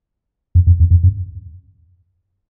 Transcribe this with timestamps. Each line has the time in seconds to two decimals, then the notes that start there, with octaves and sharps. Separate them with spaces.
0.55 F2
0.67 F2
0.80 E2
0.91 F2
1.03 F#2